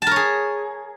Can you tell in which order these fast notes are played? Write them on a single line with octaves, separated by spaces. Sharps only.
A5 A#4 C#5 G#4